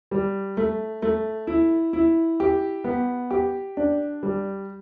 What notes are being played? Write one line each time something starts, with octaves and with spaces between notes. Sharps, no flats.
G3
A3
A3
E4
E4
G4
B3
G4
D4
G3